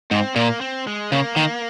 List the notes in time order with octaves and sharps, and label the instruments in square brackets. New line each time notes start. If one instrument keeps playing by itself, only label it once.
[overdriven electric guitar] G#2 [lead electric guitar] C4
[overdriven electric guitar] A#2 [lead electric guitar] A#3
[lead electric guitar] C4
G#3
[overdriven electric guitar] C#3 [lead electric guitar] A#3
[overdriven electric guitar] D#3